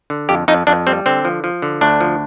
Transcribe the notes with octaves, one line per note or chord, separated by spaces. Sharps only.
D3
F2 G4
F2 D#4
F2 D4
G3 C4
D3 C4
F3
F3
D3
D2 D4
F3